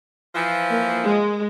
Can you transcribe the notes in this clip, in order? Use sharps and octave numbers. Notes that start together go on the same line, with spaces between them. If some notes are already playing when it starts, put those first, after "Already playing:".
E3 F3
A#3 A#4
G#3